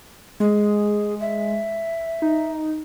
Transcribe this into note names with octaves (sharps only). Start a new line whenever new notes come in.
G#3 G#4
E5
D#4